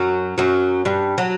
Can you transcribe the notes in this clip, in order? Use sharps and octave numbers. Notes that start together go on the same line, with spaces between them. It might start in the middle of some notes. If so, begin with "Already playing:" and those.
Already playing: F#2 F#3
F#2 F#3
G2 G3
F#3